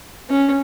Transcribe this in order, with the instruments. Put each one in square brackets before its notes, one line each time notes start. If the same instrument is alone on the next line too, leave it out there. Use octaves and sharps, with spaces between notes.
[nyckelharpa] C#4